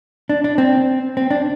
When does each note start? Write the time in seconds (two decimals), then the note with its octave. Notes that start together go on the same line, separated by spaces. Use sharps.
0.29 D4
0.44 D4
0.58 C4
1.17 C4
1.31 D4